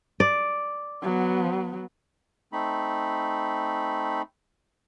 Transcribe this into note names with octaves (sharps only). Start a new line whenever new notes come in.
D5
F#3 B3
A3 C4 D#4 B5